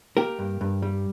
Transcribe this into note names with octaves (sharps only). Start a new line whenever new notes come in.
A#3 G4 A#4
G2
G2
G3